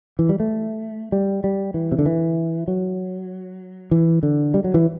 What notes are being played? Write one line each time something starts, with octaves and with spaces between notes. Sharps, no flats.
E3
G3
A3
G3
G3
E3
C3
D3
E3
F#3
E3
D3
G3
F#3
E3